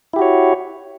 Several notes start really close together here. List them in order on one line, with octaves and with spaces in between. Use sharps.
E4 G4 F#4 C#5